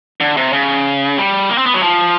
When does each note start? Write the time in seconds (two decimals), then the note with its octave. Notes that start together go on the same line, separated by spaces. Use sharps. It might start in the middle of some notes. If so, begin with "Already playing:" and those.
0.20 D3
0.37 C3
0.53 C#3
1.18 G3
1.50 A#3
1.58 C4
1.66 B3
1.74 F#3
1.82 F3